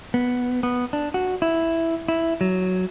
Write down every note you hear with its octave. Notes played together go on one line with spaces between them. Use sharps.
B3
B3
D4
F#4
E4
E4
F#3